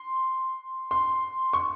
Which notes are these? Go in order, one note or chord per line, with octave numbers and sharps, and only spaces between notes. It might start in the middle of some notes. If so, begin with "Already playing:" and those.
Already playing: C6
C6
C#6